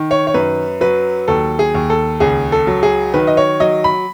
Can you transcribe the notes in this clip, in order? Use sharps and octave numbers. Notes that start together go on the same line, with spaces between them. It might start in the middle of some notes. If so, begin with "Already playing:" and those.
Already playing: D#3
C#5
C#5
F#2 B4
F#3 B4
D#2 A4
G#4
D#2
A4
C#2 G#4
A4
F#3
G#4
D#3 B4
D#5
C#5
F#3 D#5
B5